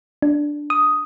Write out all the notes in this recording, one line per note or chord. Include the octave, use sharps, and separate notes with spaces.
D4
D#6